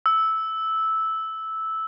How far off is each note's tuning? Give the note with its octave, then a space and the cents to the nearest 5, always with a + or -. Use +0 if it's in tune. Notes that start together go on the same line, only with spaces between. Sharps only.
E6 -10